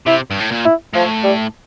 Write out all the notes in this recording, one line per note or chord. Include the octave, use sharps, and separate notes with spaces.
C3 E4
G2
A2
A#2
E4
A2 F3
G3